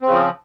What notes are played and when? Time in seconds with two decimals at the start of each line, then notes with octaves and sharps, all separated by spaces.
0.02 C4
0.07 C#3
0.12 F3